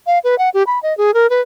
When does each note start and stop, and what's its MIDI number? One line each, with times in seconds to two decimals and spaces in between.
0.07 0.19 77
0.24 0.38 71
0.38 0.49 78
0.54 0.63 67
0.67 0.79 83
0.83 0.96 75
0.98 1.14 68
1.14 1.29 70
1.30 1.41 71